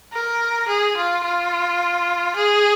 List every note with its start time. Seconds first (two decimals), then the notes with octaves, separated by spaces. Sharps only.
0.13 A#4
0.68 G#4
0.97 F4
1.24 F4
2.36 G#4